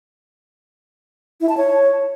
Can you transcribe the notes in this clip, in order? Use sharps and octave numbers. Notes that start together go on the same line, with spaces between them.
E4
A5
C#5